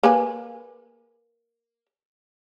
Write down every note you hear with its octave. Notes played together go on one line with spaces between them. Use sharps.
A#3 B4 G#5